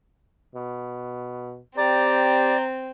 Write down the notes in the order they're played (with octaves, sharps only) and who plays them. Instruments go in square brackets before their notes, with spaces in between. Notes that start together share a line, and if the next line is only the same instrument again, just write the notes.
[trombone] B2
[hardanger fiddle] C4 [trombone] G4 [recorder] D5 [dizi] A#5